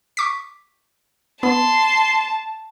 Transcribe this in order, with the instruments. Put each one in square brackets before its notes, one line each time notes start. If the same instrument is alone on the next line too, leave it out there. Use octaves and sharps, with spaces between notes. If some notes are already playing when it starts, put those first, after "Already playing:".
[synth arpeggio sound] C#6 D6 B6
[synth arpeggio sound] B3 [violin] A5 [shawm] C6